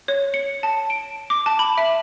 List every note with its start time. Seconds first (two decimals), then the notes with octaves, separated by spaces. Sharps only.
0.08 C#5
0.34 C#7
0.63 A5
0.90 D7
1.30 D6
1.46 A5
1.59 B5
1.78 E5